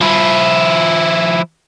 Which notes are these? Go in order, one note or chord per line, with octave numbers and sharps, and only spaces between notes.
F3 E4